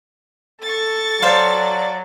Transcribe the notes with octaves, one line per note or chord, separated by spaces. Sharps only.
A4 C#6 A6
F#3 A4 C5 D5 F5